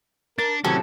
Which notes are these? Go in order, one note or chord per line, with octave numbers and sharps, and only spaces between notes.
D4 A#4 A6
A2 C3 D#3 F#3 C#4 A4